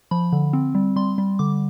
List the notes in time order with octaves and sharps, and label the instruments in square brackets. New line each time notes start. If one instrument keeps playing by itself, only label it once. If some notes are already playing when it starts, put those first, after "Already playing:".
[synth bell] F3 B5
D3
C4
G3
G3 C6
G3
D3 D6